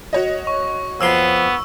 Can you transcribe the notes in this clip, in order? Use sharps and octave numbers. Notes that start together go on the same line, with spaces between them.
F#4 C#5 D#5
C#6
F2 F3 B3 C6 E6